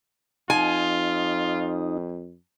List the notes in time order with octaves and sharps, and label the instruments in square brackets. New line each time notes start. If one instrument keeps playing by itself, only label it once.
[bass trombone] F2 [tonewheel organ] D#4 [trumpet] F4 [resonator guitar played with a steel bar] G#5